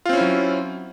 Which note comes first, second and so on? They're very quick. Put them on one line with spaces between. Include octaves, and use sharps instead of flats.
F4 C4 C#4 E4 F#3